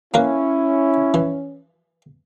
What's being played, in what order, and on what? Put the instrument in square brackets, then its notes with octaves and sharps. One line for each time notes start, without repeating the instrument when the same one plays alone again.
[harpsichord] A#3 A#4 B4 [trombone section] C#4 [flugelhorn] E4
[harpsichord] E3